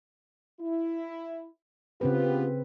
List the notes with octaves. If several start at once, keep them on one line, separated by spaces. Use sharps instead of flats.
E4
C#3 B3 C4 F4 G4 B4